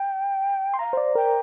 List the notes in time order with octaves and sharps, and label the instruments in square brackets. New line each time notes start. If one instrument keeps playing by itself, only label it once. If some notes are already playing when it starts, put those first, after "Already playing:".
Already playing: [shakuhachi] G5
[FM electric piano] C6
[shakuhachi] F5 [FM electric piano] A#5
[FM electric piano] C5
D5
[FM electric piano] A#4 [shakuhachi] G5